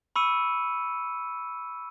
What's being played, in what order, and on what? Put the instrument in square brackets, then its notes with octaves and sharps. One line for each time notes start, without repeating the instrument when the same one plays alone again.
[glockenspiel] B5 C#6 E6 C#7 D#7